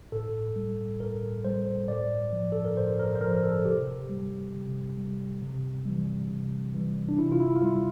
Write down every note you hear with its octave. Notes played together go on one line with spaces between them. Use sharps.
A2 A4
G3
A2 A#4
G3 C5
A2 D5
F3
A4
A#4
A2 C5
A#4
C5
F3 A#4
A#4
A4
C3 G4
G3
C3
G3
C3
E3 G3
C3
E3 G3
D4
C3 E4
F4
E4
F4
G3 E4